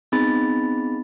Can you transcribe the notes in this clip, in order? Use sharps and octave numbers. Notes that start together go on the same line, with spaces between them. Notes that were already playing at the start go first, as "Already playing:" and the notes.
B3 C4 D#4 G#4 B5 A6